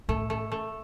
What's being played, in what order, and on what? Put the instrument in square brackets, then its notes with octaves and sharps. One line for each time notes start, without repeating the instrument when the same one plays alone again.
[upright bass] A2 [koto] A3
[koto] A3
A3